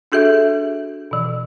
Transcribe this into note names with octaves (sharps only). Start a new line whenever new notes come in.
D4 F#4 G#4 A4 E5
B2 E3